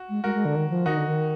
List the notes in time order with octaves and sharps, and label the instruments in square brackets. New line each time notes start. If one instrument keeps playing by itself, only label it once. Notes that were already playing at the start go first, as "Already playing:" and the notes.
Already playing: [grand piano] F#4
[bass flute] G#3
[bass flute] G#3 [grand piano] F#4 A#4
[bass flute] G#3
D3
D#3
F3
[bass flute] D#3 [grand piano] D#4 F#4
[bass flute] D3
D#3